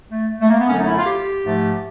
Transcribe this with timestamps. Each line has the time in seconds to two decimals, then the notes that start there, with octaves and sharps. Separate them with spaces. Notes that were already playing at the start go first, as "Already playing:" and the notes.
0.11 A3
0.40 A3
0.49 A#3
0.59 B3
0.68 F#2 D3 F#3 A3 C#4
0.78 D#4
0.87 E4
0.97 F4
1.06 G4
1.44 G#2 F3 A3